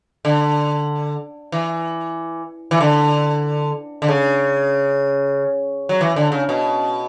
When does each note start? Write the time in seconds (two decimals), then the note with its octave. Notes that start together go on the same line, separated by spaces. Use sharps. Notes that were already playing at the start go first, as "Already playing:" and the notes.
0.25 D3
1.52 E3
2.71 E3
2.81 D3
4.02 D3
4.08 C#3
5.89 F#3
6.01 E3
6.16 D3
6.32 C#3
6.49 B2